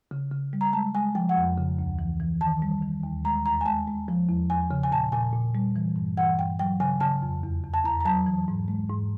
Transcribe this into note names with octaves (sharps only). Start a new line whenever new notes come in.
C#3
C#3
G3
A#5
G#3 A5
G#3 G#5
F3 G5
F#5
F2
C#3
D2
E3
E3
D#3 A5
G3
D#3
D#2
G#3 A#5
E2 A#5
G#5
G#3 A5
G#3
F3
E2
E2 G#5
C#3
G#5
A#2 A5
A#2 G#5
A#2
G3
E3
G2
E3 F#5
G2 G5
F#3 G5
C#3 G#5
C#3 A5
F2
E2
E2
A5
E2 A#5
A#5
F#3 A5
E3
G#2
G#3
G#2